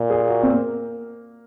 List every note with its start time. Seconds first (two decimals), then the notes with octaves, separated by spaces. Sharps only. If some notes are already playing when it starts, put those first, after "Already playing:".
Already playing: A#2
0.10 G#4
0.29 F#4
0.43 C4
0.50 A#3